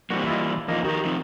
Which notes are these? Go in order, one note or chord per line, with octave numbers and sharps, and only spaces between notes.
E3 G3 A#3 C4 F#4
E4 F4 D#5
E2 F3 A#3 D#4 D#5
D#3 F#4 G4 A#4
F3 C4 D#4